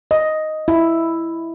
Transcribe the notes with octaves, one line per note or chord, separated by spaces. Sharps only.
D#5
E4